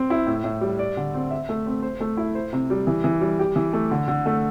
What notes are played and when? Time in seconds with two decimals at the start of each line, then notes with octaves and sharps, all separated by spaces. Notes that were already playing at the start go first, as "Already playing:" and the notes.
Already playing: C4
0.10 E4
0.27 A2
0.44 A2
0.61 G3
0.79 D5
0.97 D3
1.14 C4
1.31 E5
1.49 A3
1.66 C4
1.82 C5
2.00 A3
2.17 E4
2.35 C5
2.53 C3
2.70 G3
2.87 E3
3.04 E3
3.21 G3
3.39 G4
3.56 E3
3.73 A3
3.91 D3
4.08 D3
4.26 A3